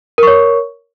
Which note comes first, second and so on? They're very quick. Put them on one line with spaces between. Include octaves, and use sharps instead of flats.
A#4 C#6 C#5